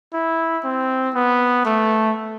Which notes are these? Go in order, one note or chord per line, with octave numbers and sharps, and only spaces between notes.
E4
C4
B3
A3